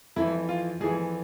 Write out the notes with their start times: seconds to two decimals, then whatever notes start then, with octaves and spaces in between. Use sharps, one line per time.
0.16 F2 E3 E4
0.49 F4
0.80 F2 E3 G#4